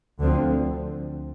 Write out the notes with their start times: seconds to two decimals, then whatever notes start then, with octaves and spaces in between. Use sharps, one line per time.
0.20 D2 D3 F3 C4